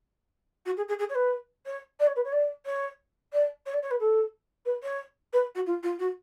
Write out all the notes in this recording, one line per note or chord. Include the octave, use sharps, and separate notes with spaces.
F#4
G#4
G#4
G#4
C#5
B4
C#5
D5
C#5
B4
C#5
D5
C#5
D5
C#5
D5
C#5
B4
A4
B4
C#5
B4
F#4
F4
F4
F#4